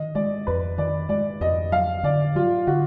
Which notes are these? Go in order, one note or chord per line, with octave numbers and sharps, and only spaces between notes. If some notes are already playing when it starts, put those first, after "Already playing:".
Already playing: D#3 D#5
G#3 D5
F2 B4
D#3 D5
G#3 D5
F2 D#5
F#3 F5
D3 D5
F#3 F4
D3 F#4